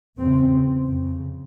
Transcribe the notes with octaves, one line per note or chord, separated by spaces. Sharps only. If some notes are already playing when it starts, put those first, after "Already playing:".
E2 C#3 C4
F2 C#3